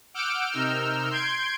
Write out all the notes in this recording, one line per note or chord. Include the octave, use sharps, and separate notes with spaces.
F#5 D6 E6 F6 G6 D7
C3 D#4 A#4 E6 F6 G6
C6 G6 G#6 D7